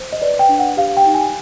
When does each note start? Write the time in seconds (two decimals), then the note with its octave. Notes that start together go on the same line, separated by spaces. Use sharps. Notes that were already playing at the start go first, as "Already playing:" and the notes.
Already playing: C5
0.13 D#5
0.22 B4 D5
0.39 G5
0.49 D4
0.59 F#5
0.77 G4 F5
0.97 G5
1.06 D#4
1.14 G#5